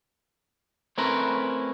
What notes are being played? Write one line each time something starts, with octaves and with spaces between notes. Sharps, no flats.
A3 C4 C#4 E4 A#4 B4